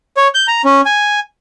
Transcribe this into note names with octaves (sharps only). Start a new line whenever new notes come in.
C#5
G6
A#5
C#4
G#5